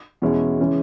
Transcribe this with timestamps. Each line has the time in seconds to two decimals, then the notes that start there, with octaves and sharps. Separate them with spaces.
0.22 E2 B2 G#3 C#4 E4
0.59 C#3 E3 G#3 C#4